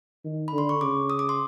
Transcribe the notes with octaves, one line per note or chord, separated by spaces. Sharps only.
D#3
D3 B5
C6
C#6
C#3 D6
D#6
D6
C6